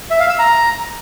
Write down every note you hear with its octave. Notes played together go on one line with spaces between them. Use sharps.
E5
F5
E6
A#5